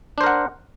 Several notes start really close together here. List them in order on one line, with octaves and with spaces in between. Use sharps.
D4 C5 A#4 F#5